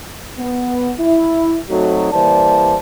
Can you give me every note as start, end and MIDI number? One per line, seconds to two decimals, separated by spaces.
0.38 0.92 59
0.99 1.57 64
1.69 2.08 54
1.69 2.08 57
1.69 2.08 60
1.69 2.08 63
1.69 2.08 66
2.12 2.76 52
2.12 2.76 55
2.12 2.76 58
2.12 2.76 72
2.12 2.76 74
2.12 2.76 81